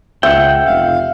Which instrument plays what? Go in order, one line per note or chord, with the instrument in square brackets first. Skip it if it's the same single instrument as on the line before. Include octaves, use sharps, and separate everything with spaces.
[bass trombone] C#2 [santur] E5 [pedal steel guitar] F#5 G5
[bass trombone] F1 [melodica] F5